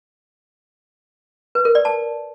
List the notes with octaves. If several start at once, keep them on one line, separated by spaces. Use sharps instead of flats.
B4
A#4
D5
A5